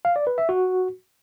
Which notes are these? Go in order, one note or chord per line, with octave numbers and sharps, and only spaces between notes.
F5
D5
B4
E5
F#4